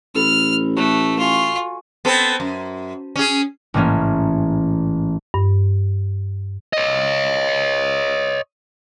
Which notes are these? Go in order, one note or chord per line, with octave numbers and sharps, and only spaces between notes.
A1 A4 B5 F6
A3 F#4
F4 G#5 C#6 B6
B3 C4 A4
F#2
C#4 G#4
A1 G#2 E3 A#3 C#4
G2
C#5 D#5